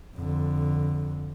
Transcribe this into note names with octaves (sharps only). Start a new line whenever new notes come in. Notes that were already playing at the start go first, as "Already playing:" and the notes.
F2 D3